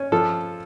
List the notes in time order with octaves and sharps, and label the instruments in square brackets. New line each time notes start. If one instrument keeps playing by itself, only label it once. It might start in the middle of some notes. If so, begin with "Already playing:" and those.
Already playing: [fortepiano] C#4
F3 A4